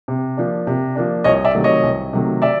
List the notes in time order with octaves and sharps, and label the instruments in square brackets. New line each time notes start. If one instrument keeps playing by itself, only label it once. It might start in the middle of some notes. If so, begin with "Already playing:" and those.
[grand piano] C3
F3 A#3 D4
C3
F3 A#3 D4
C2 C#5 D#5
D5 E5
C3 D#3 F#3 A3
C#5 D#5
C2
C3 D#3 F#3 A3
D5 E5